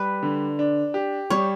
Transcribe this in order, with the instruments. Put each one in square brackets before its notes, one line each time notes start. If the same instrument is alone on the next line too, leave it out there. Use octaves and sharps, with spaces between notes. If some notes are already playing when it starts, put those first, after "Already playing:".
Already playing: [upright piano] G3 [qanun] B4
[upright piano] D3
D4
G4
[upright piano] G3 [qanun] C#5